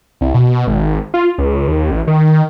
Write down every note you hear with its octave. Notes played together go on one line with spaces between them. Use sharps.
C2
B2
G#1
F4
C#2
D#2
A1
D#3